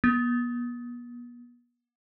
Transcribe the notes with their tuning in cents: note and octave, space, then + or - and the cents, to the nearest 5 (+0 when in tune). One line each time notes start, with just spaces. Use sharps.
B3 -40